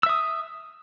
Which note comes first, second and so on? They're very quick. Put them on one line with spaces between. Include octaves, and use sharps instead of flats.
E6 E5 D#6